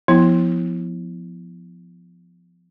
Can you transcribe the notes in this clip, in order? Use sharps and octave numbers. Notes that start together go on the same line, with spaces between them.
F3 B3 E4